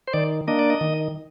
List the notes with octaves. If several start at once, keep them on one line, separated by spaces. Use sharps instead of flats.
C5
D#3 D5
A#3 D4 D#5
D5
D#5
D#3